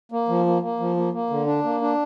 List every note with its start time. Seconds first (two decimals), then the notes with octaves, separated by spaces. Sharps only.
0.12 A#3
0.29 F3
0.46 A#3
0.62 A#3
0.80 F3
0.97 A#3
1.13 A#3
1.30 D3
1.47 D4
1.64 A#3
1.81 D4